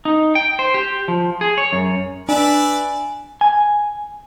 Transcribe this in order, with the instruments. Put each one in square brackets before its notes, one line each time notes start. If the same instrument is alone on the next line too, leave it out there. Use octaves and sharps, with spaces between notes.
[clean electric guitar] D#4
G5
C5
G4
F3
G#4
C#5
F#2
[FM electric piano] D4 [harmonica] B4 D5 E5 [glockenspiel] G#5
[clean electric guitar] G#5